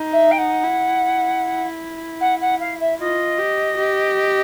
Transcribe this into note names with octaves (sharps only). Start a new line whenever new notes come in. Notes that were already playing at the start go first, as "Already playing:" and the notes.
Already playing: D#4
E5
G5
F#5
E4
F#5
F#5
F5
E5
F4 D#5
G4
G4